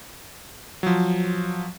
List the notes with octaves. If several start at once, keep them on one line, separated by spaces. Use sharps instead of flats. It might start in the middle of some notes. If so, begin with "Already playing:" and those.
F3 F#3